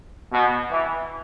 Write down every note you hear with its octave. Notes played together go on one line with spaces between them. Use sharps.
B2
E3